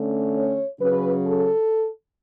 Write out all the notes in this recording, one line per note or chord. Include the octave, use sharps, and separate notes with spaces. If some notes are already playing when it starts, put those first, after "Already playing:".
Already playing: D3 A3 C#4
C#5
C#3 F#3 C#4 B4
A4